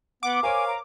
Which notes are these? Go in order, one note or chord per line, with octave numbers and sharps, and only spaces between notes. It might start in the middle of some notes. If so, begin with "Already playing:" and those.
B3 F#5 D6
A#4 C5 C#5 F5 G#5
A#5